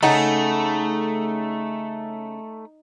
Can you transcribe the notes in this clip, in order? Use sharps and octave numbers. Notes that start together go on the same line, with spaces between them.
C#3 A3 D#4 A4 F#5